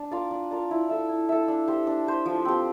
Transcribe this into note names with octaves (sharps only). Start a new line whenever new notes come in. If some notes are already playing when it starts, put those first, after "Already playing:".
Already playing: D4
F4 A#4 D5
D4
F4 A#4 D5
E4
A4 E5
E4
A4 E5
D4
G4 C5
D4
G4 C5
F3
C4 G4